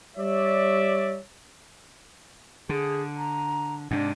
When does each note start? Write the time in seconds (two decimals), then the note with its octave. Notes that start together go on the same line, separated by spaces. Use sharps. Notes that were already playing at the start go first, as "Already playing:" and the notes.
0.17 G3 C#5 D5 E5
2.69 D3 G#4
3.17 A#5
3.91 G#2 C3 D4